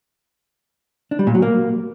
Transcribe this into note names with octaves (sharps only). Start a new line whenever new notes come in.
D4
G3
A#2
F#3
A#3